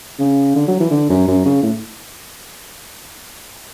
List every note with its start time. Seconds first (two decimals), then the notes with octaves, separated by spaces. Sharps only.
0.20 C#3
0.56 D3
0.68 F#3
0.80 E3
0.91 D3
1.09 F#2
1.28 F#2
1.45 C#3
1.63 A2